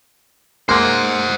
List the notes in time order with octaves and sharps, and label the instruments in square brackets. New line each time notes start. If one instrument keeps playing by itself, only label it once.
[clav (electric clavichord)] G#3 A#3 [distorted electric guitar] C5 F#5 [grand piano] C6